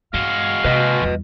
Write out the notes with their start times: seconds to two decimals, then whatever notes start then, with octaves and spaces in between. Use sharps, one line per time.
0.14 G2 G#3 F#4 F5
0.64 C3 B4 D#5
1.02 E2 G3